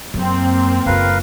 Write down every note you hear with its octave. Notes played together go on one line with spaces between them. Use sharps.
F#2 A#3 C4
F#1 F4 A#4 B4 F5